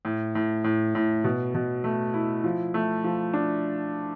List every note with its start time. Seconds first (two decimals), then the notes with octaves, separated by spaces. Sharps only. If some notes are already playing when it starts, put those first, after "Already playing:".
0.05 A2
0.35 A2
0.64 A2
0.95 A2
1.24 B2
1.55 B2
1.84 A3
2.14 E4
2.44 F3
2.74 A3
3.04 F3
3.34 D4